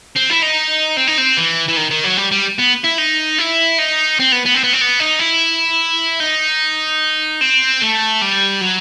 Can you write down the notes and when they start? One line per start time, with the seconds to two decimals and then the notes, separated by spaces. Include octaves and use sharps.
0.16 C4
0.30 E4
0.43 D#4
0.97 C4
1.08 D#4
1.18 C4
1.37 E3
1.68 E3
1.77 D#3
1.91 D#3
2.04 F#3
2.17 G3
2.31 G3
2.59 B3
2.84 E4
2.98 D#4
3.39 E4
3.79 D#4
4.20 C4
4.32 B3
4.46 B3
4.55 C4
4.63 B3
4.73 C4
4.81 B3
5.00 D#4
5.19 E4
6.20 D#4
7.41 C4
7.82 A3
8.22 G3
8.61 F#3